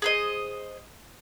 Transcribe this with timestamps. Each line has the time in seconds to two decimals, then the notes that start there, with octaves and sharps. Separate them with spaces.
0.02 G#4 C5 D#5